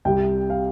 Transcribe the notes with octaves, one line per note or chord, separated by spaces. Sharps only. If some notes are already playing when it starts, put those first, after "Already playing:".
C2 C3 G3 G5
F5